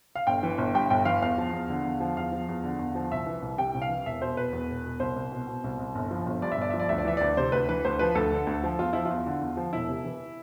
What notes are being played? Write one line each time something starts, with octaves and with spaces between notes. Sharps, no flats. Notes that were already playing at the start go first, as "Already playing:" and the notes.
F5
G1 G5
E3
G1
G2 G5
G1 G5
E3 F5
E2 F5
F3
E2
D3
E2
F3
E2 F5
F3
E2
D3
E2
F3
C2 E5
E3
C2
C3 G5
C2
F5
E3
E1 E5
B2 C5
E1 B4
E2
E1
B2
C2 C5
C2
B2
B2
C2
C2
G1
F3
G1
G2 D5
E5
G1 D5
F3 E5
D5
D2 E5
D5
E3 E5
D2 D5
C3 C5
D2 B4
E3 B4
D2 C5
F3 B4
D2 A4
D3
D2
F3
E2 F4
F3 E4
E2 F4
D3
E2
F3
E1 E4
C3
E3